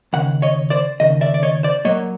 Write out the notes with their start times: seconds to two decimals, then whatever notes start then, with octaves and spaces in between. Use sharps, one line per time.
0.13 D#2 C#3 F#5
0.42 C#5 D#5
0.70 C5 D5
1.00 D#2 C#3 D#5
1.21 D5 E5
1.34 D5
1.43 C#5 D#5
1.63 C5 D5
1.85 A#2 F#3 A#3 C#5 D#5